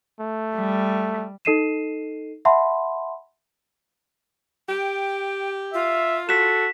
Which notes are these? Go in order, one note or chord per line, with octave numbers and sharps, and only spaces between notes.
A3
G3
D#4 A4 D#5 C7 D#7 E7
E5 F#5 A5 B5 C6
G4 G5
F4 E5
F#4 A4 B6 E7